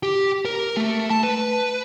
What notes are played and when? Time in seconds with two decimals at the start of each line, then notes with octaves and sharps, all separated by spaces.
0.03 G4
0.45 A#4
0.77 A3
1.10 A5
1.23 B4